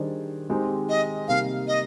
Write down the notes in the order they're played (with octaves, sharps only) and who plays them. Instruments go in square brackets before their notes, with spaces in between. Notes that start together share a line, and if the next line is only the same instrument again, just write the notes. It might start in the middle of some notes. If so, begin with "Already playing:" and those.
Already playing: [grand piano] D#3 G3 D4 G#4 C5
D#3 G#3 C4 D#4 G4
[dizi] D#5
[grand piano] C3 G3 A#3 D#4 A#4 [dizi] F5
[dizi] D#5